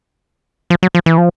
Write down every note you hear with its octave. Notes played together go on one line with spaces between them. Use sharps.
F3
F#3
F3
E3
F3